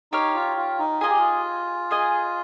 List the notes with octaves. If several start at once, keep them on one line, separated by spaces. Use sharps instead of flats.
D#4 G4 C#5 F5
F4
F4
D#4
F4 G#4 D#5 G#5
G4
F4
G#4 D#5 G#5